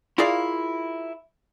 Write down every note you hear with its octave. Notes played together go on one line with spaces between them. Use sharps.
E4 F4 G#4 A#4 D5 F5